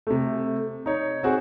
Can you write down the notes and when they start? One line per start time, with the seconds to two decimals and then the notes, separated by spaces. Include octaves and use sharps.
0.07 C3 A3
0.86 D#4 C#5
1.23 C4 F#4 G#4